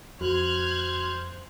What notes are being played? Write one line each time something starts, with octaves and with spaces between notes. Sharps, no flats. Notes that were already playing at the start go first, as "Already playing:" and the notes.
F2 F#4 C5 F6 F#6 G#6